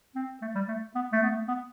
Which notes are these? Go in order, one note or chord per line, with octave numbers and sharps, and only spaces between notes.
C4
A3
G3
A3
B3
A3
B3
A3
B3